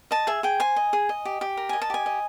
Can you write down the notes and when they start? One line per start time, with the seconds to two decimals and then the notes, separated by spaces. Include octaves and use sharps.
0.11 D#5 A5
0.27 G#4 E5
0.43 G#4 G5
0.60 C5 G#5
0.76 D#5
0.93 G#4
1.09 D#5
1.25 G4
1.41 G4
1.57 A#4
1.69 D#5 G#5
1.82 A5
1.90 G4 G#5
2.06 D#5